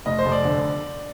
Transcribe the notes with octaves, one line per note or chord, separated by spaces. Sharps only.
F1 D#5
C5
F1
D5
D3